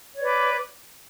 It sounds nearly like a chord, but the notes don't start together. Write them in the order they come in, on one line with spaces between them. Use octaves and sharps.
C#5 D5 B4 D6